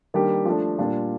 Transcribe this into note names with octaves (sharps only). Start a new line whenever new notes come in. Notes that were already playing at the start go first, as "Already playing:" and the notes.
D#3 G3 A#3 D4 G4
F3 A3 D4
A#2 G3 D4 F4